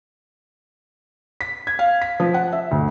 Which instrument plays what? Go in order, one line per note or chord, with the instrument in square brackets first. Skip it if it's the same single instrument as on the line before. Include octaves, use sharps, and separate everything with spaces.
[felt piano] B6
G#6
F5
B6
F3
F#5
E5
D2